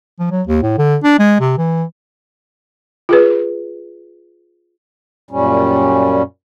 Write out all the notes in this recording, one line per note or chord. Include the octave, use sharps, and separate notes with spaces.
F3
F#3
D#2
A2
D3
D4
G#3
C3
E3
F4 G#4 B4
F#2 A#2 G3 C#4